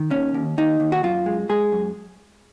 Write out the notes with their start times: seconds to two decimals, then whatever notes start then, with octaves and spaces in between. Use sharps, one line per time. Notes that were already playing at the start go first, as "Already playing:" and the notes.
Already playing: D#3
0.10 D#2 C#4
0.34 D#2
0.58 D#2 D#4
0.80 D#2
0.92 F#4
1.03 F#2 F4
1.26 G#3
1.49 G#3 G#4
1.72 F#2